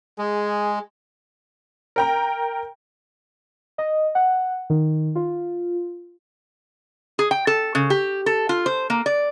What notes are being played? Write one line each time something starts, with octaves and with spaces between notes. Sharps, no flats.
G#3 G#4
A#4 G5 A#5
D#5
F#5
D#3
F4
G#4
G5
A4
C#3
G4
A4
F4
C5
A#3
D5